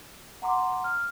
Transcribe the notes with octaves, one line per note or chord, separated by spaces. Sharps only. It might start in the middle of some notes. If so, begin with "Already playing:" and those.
F#5 A#5 C6 D6
F6